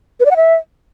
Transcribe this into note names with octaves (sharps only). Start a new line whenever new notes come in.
B4
D5
F#5
E5